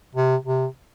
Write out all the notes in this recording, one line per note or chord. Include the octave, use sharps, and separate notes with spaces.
C3
C3